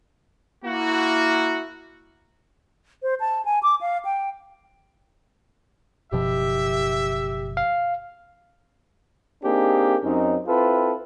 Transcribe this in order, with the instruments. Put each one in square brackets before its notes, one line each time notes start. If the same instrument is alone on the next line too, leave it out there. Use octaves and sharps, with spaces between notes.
[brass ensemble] A#3 E4 F#4
[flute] C5
A5
G#5
D6
F5
G5
[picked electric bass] F#1 B2 F3 [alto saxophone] G4 [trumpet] E5
[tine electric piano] F5
[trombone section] A#3 C4 D4 D#4 G4 G#4
F#2 C4 C#4 D#4
C4 E4 F4 A4 B4